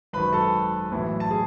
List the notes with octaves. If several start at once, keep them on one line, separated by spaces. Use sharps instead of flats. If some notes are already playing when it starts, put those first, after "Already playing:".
G#1 F#2 D#3 B4 B5
A4 A5
B1 A2 E3
A5
G#4